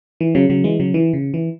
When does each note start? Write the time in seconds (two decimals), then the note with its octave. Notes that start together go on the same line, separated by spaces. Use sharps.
0.20 E3
0.35 C#3 F#3
0.50 C#3 F#3
0.64 E3 G#3
0.80 C#3 F#3
0.94 E3
1.13 C#3
1.34 E3